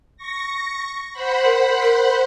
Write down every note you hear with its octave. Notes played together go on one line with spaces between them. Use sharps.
C#6 A#6
C5 F#5 B5
A#4
A#4